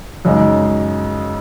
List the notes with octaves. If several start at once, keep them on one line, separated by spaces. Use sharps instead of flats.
F#2 C#3 G#3 D#4